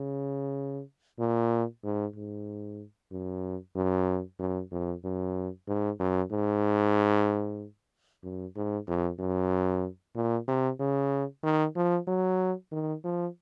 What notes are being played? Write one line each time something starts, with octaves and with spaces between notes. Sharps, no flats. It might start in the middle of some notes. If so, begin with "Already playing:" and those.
Already playing: C#3
A#2
G#2
G#2
F#2
F#2
F#2
F2
F#2
G#2
F#2
G#2
F#2
G#2
F2
F#2
A#2
C3
C#3
D#3
F3
F#3
D#3
F3